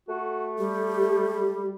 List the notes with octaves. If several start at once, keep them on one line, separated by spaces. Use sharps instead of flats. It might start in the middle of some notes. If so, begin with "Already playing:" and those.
A3 F#4
G3 G4